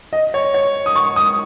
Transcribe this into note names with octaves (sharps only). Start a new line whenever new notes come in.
D#5
C#5
C#5
D#6
C#6
D#6